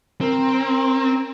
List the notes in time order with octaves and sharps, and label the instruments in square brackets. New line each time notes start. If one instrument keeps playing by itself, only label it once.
[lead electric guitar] C4 [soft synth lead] A#4